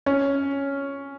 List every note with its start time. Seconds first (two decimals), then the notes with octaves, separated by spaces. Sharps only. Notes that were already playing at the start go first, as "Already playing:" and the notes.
0.06 C#4